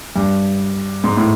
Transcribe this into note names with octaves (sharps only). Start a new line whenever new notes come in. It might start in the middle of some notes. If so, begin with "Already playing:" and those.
G2
G#2
A2